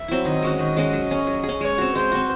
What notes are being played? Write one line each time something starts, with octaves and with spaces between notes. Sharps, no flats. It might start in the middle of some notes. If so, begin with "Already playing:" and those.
Already playing: E5
F#3 C4 E4
D#3 D#5
G#3 C#4 F#4
D#3 D#5
G#3 C#4 F#4
F#3
C#4 G#4
F#3
G#4
C#4
G#3 C#5
C4 F#4
G#3 C5
C4 F#4